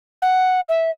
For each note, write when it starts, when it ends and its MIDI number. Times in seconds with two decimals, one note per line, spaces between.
0.22 0.60 78
0.69 0.90 76